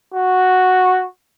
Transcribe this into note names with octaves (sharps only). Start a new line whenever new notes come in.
F#4